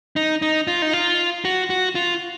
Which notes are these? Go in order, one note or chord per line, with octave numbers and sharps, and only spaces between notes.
D#4
D#4
F4
D#4
F4
F#4
F#4
F4